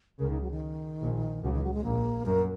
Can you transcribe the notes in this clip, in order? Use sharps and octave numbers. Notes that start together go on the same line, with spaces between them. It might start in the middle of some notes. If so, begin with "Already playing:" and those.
C#2 C#3 A#4
D#4
F#3
D#3
A#1 A#2
C#2 C#3 F#3
D#3
F#3
G#3
A#1 A#2 A#3
F#2 A#4